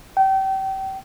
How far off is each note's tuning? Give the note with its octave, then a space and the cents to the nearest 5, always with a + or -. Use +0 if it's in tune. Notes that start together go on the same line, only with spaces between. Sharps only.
G5 -30